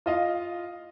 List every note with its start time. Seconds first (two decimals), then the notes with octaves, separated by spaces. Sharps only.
0.06 F4 D#5 F5